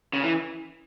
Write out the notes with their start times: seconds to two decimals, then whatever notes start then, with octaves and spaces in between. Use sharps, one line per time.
0.13 C#3
0.23 E3